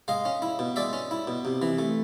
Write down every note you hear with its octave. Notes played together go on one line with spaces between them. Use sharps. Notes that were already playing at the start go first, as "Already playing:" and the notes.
G#3 D#5 F5
C#4
E4
B2
G#3 D5 E5
C#4
E4
B2
C3
E3
A3